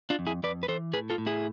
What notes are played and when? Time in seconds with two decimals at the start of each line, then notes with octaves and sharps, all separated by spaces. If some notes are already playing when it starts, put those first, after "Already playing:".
0.10 D4 F4
0.19 F2
0.27 E4 G#4
0.43 F2 B4 D5
0.63 B4
0.68 E3 A4 C5
0.93 A2 G#4 B4
1.10 F4 A4
1.18 A2
1.26 E4 G#4